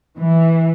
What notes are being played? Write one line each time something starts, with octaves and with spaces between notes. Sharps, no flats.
E3